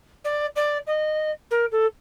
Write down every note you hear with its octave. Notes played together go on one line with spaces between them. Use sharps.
D5
D5
D#5
A#4
A4